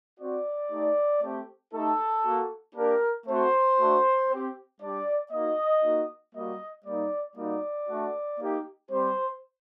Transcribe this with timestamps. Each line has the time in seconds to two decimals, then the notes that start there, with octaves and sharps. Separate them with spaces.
0.19 C4 F#4 D5
0.71 A3 D#4 G4
1.22 A3 C4 G4
1.73 A3 D#4 G4 A4
2.24 A#3 F#4
2.75 A#3 D4 G4 A#4
3.27 A3 C4 F#4 C5
3.78 A3 D4 F#4
4.29 C4 G4
4.80 G3 D4 G4 D5
5.31 A#3 D#4 F#4 D#5
5.83 A#3 D#4 F#4
6.34 G3 A#3 F#4 D#5
6.85 G3 A#3 D#4 D5
7.36 G3 A#3 D#4 F#4 D5
7.88 A3 D4 F#4
8.40 A#3 D#4 G4
8.90 G3 C4 G4 C5